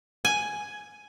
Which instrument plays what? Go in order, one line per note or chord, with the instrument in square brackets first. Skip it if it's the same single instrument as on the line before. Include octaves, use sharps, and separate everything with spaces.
[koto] G#5